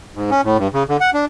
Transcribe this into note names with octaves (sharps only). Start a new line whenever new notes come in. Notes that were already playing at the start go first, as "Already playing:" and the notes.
G#2
C#4
A2
G2
C#3
D3
F#5
D4